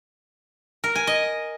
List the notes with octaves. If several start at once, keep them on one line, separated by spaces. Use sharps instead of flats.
A#4
G#5
D#5